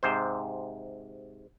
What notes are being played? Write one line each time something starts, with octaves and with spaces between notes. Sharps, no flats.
G#2 C3 C5